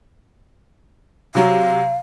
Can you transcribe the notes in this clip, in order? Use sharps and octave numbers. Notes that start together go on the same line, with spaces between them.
C3 F#3 F5